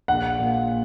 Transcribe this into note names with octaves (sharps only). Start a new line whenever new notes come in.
A#1 F#5
A#2